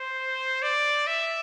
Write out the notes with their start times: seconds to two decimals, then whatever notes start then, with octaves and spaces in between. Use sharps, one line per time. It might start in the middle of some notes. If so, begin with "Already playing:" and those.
Already playing: C5
0.62 D5
1.07 E5